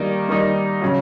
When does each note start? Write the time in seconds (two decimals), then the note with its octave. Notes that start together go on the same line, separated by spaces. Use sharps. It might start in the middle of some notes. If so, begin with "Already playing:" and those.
Already playing: D#3 G3 A#3 D#4
0.29 D#3 G3 A#3 D#4
0.81 C#3 F#3